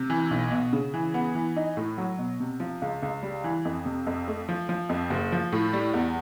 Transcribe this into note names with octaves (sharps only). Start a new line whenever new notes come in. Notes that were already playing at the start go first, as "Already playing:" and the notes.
Already playing: C3
E3
B1
B2
C#3
E3
B3
E3
D#4
A2
F#3
B2
C3
F3
C#2
C#2
G3
E3
F2
C3
F2
A3
F3
F3
F2
F#1
F3
A2
G3
E2